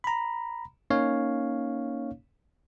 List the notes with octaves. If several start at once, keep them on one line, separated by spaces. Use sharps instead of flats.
A#5 B5
A#3 C#4 D#4 C#5 F5